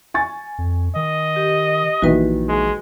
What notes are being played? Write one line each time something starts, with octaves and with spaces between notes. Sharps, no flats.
G#5 C#6 A6
F2
D#3 D#5
G4
A#1 A#2 D#3 E3 F#4 B4
G#3